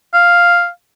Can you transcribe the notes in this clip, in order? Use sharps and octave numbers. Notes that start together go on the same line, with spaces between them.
F5